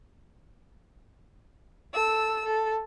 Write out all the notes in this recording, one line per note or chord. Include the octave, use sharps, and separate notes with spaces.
A4 E6
A4